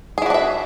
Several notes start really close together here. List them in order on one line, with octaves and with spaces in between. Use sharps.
G#4 E4 F#4 D4 E5